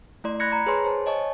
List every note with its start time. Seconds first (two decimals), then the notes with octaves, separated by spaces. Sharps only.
0.24 A3 E4 D5 C6
0.40 B5 F#6 G#6 A#6 C#7
0.52 A#5 B5 A#6
0.66 G#4 B4 C#5 G#5 C6
0.84 C5 A5
1.06 C#5 D#5 G#5 A5 C#6